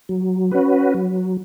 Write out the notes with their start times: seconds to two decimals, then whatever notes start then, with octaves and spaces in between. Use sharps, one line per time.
0.09 F#3
0.51 C#4 F#4 B4
0.94 F#3